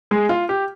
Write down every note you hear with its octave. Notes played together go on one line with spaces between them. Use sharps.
G#3 G#4
F4
G4